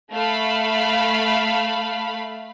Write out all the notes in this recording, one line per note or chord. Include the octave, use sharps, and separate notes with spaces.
A3 F5 B5